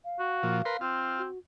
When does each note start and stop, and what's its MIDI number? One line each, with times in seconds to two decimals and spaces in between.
0.05 0.79 77
0.19 0.58 66
0.43 0.62 46
0.43 0.62 53
0.65 0.77 70
0.65 0.77 71
0.65 0.77 84
0.81 1.26 60
0.81 1.22 65
1.18 1.38 66